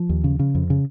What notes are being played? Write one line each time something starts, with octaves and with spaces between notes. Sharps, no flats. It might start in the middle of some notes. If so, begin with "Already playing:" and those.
Already playing: F3
D#2
C#3
C#3
F2
C#3